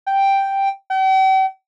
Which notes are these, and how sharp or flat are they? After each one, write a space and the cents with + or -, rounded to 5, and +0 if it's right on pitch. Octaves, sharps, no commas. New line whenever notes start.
G5 +0
G5 -45